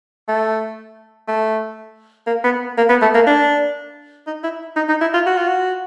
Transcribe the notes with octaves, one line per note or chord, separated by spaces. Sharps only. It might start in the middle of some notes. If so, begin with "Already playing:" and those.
A3
A3
A#3
B3
A#3
B3
A3
A#3
D4
D#4
E4
D#4
D#4
E4
F4
F#4
F4
F#4